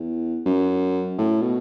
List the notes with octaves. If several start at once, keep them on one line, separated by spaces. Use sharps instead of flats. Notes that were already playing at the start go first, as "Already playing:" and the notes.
Already playing: E2
F#2
A2
B2